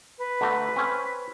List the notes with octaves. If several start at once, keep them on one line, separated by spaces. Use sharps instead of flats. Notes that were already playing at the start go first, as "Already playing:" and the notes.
B4
D3 A3 A#5
C4 C#4